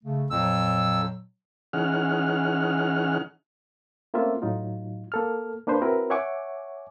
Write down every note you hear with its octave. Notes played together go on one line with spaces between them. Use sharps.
C#3 A3
F2 A#2 F#3 E6
E3 C#4 D#4 G#4 F#5 F6
A3 A#3 C4 C#4 F4 E5
A2 F#3 D#4 F4
A#3 A4 F6
A#3 D4 B4 C5
C4 E4 F#4 A#4 B4
C#5 E5 F#5 G#5 C#6 D6